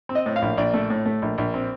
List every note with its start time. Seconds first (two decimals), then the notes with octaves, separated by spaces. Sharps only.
0.09 C4
0.15 D#5
0.26 A2
0.36 F5
0.42 A#1
0.57 A#1 D5
0.74 A3
0.90 A2
1.05 A3
1.22 A#1
1.38 A#1
1.54 C4